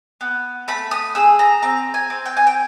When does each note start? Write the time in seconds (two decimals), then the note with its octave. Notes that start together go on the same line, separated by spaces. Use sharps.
0.21 B3
0.68 A3 B5
0.91 D#6
1.15 G#4 E6
1.39 A#5
1.62 C4 A#5
1.94 G#5
2.10 C4
2.25 G5
2.37 G#5
2.47 G5